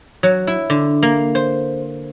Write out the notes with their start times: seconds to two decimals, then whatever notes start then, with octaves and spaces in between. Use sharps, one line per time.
0.23 F#3
0.47 E4
0.70 D3
1.03 A#3
1.35 C5